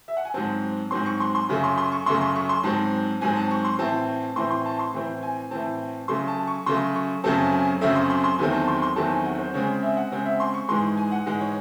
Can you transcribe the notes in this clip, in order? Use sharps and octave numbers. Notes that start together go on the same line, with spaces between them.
E5
F#5
G#5
G#2 F#3 C4 A5
G#2 F#3 C4 C6
C#6
C6
C6
F#2 C#3 F#3 A3
C6
C6
C#6
F#2 C#3 F#3 A3 C6
C6
C#6
C6
G#2 F#3 C4 A5
G#2 F#3 C4 G#5
A5
C#6
C6
A2 E3 C4 A5
A2 E3 C4 C6
C6
A5
C6
A2 E3 C4
G#5
A2 E3 C4 A5
C#3 F#3 A3 C6
A5
C#6
C#3 F#3 A3 C6
C#6
F#2 C#3 F#3 A3 C4 A5
G#5
F#2 C#3 F#3 A3 C4 E5
C6
C6
C6
E2 D#3 F#3 A3 C4 G#5
A5
C6
C6
E2 D#3 F#3 A3 C4 A5
G#5
F#5
C5
C#3 G#3 C4 C#5
E5
F#5
C#3 G#3 C4 F#5
E5
C6
C#6
G#2 E3 G#3 C6
G#5
F#5
G#2 E3 G#3
C#5